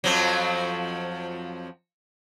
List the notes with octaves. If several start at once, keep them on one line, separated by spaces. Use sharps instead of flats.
F2 F3 F#3